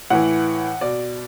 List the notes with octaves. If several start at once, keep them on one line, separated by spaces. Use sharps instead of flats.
A2 E3 F#5
B2 D5